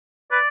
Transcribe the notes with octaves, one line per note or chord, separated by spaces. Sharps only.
B4 D5